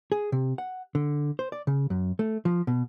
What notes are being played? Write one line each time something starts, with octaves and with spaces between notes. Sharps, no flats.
G#4
C3
F#5
D3
C5
D5
C#3
F#2
A3
F3
B2